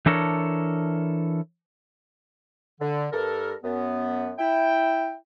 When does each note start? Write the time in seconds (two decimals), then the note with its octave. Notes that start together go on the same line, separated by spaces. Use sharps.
0.06 E3 D4 A4 A#4 C#5
2.80 D3
3.12 G2 A4 A#4
3.64 F#2 B3
4.39 E4 G5